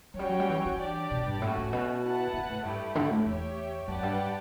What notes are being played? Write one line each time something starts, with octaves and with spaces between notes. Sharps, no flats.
F#3
G3 C#4 F#4 C#5 G5
F#3
G3
E3
E3
D4 G4 D5
B2
G2
A2 A3 C#4 F#4
A2
B2
E4 B4 F#5 A5
C#3
A2
G2 A3 E4 G4
D3
A2
E2 G4 C#5 E5
F#2 G4 B4 D5 F#5 A5
G2